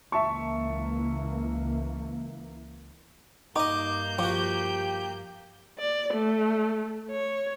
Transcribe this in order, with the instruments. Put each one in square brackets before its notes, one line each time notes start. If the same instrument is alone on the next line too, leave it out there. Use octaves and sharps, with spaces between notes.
[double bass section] C#2 E3 A#3 [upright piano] E5 A5 C#6
[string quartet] G2 A#3 G6 [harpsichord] D#4 D#5 [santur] D6
[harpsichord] F3 F#4 [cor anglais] G4 [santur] D6
[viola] D5
A3
C#5